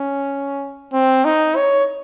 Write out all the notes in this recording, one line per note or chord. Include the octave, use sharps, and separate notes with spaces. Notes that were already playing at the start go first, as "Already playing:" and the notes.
Already playing: C#4
C4
D#4
C#5